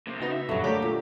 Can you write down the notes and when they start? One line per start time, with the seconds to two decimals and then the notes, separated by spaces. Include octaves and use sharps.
0.07 C2 C3 A#3
0.20 C#3 D#4 F#4 B4
0.32 E5
0.49 F#2 A#2 D3 F#3 G3
0.64 A3 A#3 G4 C#5 D5
0.82 A#2